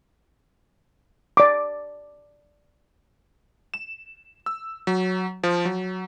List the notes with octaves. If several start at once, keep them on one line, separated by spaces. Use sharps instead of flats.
D5 D6
E7
E6
F#3
F3
F#3